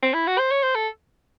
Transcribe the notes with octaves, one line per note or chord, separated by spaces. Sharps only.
C4
E4
F#4
C5
C#5
C5
A4